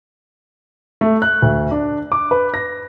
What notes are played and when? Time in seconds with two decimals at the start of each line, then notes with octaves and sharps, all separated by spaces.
1.01 A3
1.22 F#6
1.42 D2
1.71 D4
2.12 D6
2.31 B4
2.54 A#6